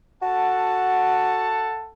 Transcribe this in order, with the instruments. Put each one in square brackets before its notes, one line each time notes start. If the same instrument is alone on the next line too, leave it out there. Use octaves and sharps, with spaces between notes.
[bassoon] F#4 [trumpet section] A4 F#5 A5